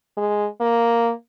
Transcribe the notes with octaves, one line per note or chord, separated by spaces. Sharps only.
G#3
A#3